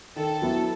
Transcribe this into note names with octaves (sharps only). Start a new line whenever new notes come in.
D#3 A4
F#3 B3 E4